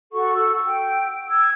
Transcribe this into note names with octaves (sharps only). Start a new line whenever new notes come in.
F#4 A4 F#5 C#6
F#5 E6
G5
E6 G#6